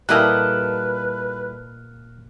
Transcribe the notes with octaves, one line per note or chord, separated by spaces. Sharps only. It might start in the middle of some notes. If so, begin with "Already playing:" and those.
A#2 G3 E4 A4 B4 D#5 F6 F#6